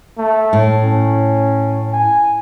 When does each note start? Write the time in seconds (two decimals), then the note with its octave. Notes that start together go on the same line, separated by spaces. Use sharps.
0.18 A3
0.53 A2
0.84 C#4
1.93 G#5